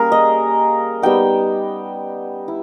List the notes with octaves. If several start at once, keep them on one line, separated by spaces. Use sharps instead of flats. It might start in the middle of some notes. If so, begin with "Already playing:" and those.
Already playing: G3 A#3 C#4 G#4 A#4
D#5
G3 B3 D#4 G5
E4